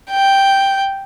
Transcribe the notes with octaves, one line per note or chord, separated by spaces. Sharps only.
G5